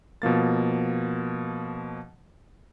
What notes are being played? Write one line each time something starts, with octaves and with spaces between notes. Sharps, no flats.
B2 F3 A#3 A6